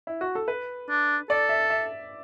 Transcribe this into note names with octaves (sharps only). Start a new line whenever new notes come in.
E4
F#4
A4
B4
D4
A4 D5
E5
E5